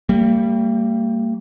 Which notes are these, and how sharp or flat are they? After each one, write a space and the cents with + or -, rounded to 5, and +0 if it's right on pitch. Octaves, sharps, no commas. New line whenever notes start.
G3 +0 A#3 -40